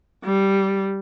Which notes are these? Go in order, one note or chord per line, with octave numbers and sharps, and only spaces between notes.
G3